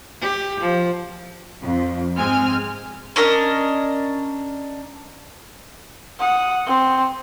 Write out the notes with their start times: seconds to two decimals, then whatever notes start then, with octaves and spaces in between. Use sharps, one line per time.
0.21 G4
0.61 F3
1.62 F2
2.17 G#2 G#3 C4 G#5 F6
3.16 C#4 D4 A#4 D#5
6.19 F#5 D#6
6.67 C4